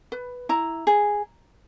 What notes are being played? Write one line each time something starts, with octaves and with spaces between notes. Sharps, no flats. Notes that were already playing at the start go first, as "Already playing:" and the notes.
B4
E4 A#5
G#4